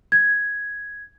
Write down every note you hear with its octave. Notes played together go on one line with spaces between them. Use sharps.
G#6